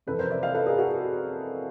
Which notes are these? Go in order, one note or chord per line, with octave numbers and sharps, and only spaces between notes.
F2 C3 E3 A4 B4
A#4 C5
D5 E5
D#5 F5
A4 B4
G#4 A#4
F#4 G#4